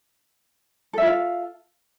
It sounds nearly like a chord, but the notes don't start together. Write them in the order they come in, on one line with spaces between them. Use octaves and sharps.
A4 E5 F4 F5